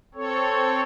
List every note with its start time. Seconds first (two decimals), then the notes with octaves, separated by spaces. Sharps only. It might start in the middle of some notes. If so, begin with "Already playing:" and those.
0.14 C4 A4 C#5